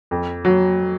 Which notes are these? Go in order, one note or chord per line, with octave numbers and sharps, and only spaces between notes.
F2
F#3